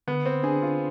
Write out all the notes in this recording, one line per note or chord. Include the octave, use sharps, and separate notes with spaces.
D3 B3
C4
D4 G#4
F4